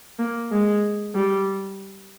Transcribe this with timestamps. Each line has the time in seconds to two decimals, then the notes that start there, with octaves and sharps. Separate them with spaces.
0.19 A#3
0.51 G#3
1.15 G3